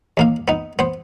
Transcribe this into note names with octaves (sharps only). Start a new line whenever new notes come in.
D#2 A#3 F5
B3 D#4
B3 C5